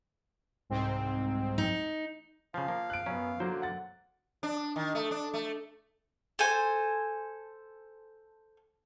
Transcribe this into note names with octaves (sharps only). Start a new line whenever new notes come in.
C2 G#2 C4
D#4
C#3 F3 F5
F3 A#3
F#6 D7
F#2 B3 C#4
D3 F#3 A#3 C5
F#5 A6
D4
D#3
A3
D4
A3
A4 C5 G#5